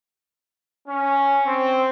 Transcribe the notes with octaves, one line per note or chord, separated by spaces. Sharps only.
C#4
C4